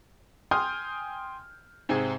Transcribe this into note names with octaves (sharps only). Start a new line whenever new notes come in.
G5 G#5 C6 D#6 F6 G6
G#2 C3 C4 G#4